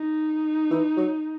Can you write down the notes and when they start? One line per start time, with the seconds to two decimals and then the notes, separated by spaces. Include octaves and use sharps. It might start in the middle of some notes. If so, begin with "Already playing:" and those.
Already playing: D#4
0.71 E3
0.97 F#3